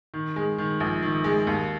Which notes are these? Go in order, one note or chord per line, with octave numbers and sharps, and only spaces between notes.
D#3
G#3
D#3
A#1
D#3
G#3
D#2